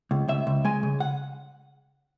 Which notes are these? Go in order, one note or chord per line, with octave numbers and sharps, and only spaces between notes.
C#2
C#2 E5
C#2
G#3 G#5
C#3
F#5